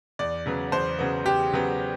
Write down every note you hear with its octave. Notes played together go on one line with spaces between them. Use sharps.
E2 D5
C#3 F#3 B3
E2 C5
C#3 F#3 B3
E2 G4
C#3 F#3 B3